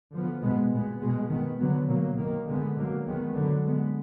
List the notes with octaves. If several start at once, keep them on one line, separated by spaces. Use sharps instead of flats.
D3 F3 B3
B2 G#3 B3
A#2 G#3 B3
B2 G#3 B3
D#3 G#3 B3
D3 F#3 B3
B2 F#3 A#3
D#3 A#3
D3 G#3 B3
D3 F#3 A#3
D#3 G#3 B3
D3 F#3 B3
D3 G#3 B3